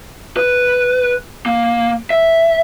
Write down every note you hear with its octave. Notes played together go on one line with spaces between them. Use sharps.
B4
A#3
E5